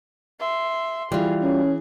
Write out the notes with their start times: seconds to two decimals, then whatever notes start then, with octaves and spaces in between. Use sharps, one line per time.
0.39 E5 C6
1.12 E3 G3 F4 G#4
1.43 C#4 G#4